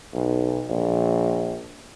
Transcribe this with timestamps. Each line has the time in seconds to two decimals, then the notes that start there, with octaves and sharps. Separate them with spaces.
0.14 B1
0.70 A#1